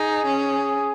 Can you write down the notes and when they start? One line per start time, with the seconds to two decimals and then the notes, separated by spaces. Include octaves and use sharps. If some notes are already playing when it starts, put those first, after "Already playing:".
Already playing: D#4 G#4
0.26 C#4